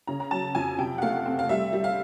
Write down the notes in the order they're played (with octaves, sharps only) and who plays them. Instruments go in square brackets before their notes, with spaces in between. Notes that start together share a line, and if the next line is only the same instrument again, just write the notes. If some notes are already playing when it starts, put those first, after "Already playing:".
[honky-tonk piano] C#3 A#5
A#5
F#3 A5
F2 G#5
C3 G5
F#5
A3 F5
C4
F5
G3 E5
G3
F5